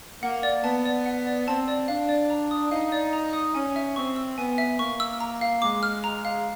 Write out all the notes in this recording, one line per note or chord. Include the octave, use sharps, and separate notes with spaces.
A#3 F#5
D5
B3 A5
D5
F#5
D5
C4 A5
D5
D4 F5
D5
A#5
D#6
D#4 F5
D5
A#5
D#6
C#4 G#5
E5
C4 C#6
E6
B3 G#5
E5
A#3 C#6
E6
A#5
F5
G#3 D6
F6
A#5
F5